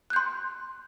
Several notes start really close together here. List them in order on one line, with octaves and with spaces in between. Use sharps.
F#6 G6 C6